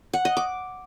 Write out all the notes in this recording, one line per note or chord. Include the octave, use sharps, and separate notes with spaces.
F#5
D#5
D6